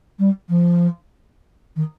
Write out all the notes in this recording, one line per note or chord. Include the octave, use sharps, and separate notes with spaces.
G3
F3
D#3